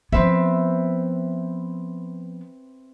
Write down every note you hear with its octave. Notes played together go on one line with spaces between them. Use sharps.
F3 B3 C4 B4 E5